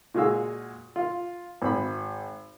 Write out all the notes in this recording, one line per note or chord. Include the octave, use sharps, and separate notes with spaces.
A#2 G#3 F#4 G#4 F5 E6
F4
G#1 B5